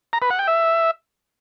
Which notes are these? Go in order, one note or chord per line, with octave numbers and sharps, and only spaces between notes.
A#5
B4
F#5
G5
E5